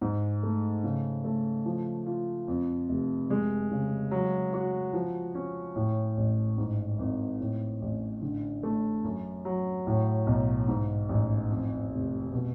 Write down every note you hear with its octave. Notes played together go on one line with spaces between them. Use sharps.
G#2
A3
C#3
A3
F3
F4
F2
F1
G#3
C#3
F#3
F#4
F3
C#4
A2
A1
G#2
G#1
A2
A1
D3
A3
F#2
F#3
A2
B1
G#2
A1
F2
F1
B2